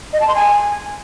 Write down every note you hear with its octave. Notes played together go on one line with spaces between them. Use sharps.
D#5
A5
C6
G#5